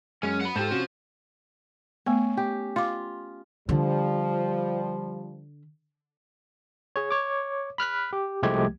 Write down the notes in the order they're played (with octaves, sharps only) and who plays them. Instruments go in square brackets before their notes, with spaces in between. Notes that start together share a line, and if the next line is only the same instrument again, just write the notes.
[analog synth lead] F#2 [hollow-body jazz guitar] G#3 [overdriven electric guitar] C#4
[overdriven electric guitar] F#5 B5
[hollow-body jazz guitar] G#2 G4 [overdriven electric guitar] F4 C5 [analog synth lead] A4
[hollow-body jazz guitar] C3 C#4 [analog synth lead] F#4
[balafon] A3 B3 [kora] C#4
[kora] G4
[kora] F4 [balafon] F5 D6
[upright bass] D3 [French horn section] F3 G3
[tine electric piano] G#4 C#5
C#5 D6
B5 F6 F#6 B6
G4
C2 F3 G#3 A3 G4 G#6